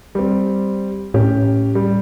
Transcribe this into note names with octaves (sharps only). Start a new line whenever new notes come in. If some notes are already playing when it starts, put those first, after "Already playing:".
G3 C4
A2 C#4 G4
G3